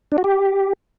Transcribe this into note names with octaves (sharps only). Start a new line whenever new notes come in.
D4
F#4
G4